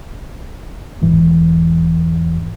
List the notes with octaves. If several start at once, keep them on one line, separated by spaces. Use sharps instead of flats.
E1 G#2 E3 G#3